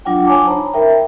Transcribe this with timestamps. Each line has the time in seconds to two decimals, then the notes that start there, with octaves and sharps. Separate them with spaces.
0.05 F#3 D4 F4 F#5 G5
0.25 C#5 G#5 A5 D6
0.46 D#4 C5 A#5 B5
0.74 A#4 E5 G5